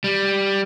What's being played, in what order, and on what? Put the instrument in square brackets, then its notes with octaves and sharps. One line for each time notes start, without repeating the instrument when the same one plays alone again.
[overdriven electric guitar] G3